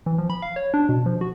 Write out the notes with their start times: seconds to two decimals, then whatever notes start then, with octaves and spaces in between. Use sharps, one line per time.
0.06 E3
0.18 F3
0.30 B5
0.42 F5
0.56 C#5
0.74 D4
0.89 B2
1.06 F3
1.21 F#4